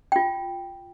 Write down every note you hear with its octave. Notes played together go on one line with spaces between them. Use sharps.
F4 G5